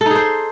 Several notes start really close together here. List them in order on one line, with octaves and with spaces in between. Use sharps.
A4 D#4 G#4 C5